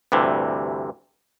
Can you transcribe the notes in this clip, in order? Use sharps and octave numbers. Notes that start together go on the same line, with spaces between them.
D2 G2 C3 E3